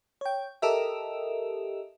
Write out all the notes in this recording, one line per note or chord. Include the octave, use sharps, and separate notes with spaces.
C#5 G5
G4 A4 A#4 D#5 E5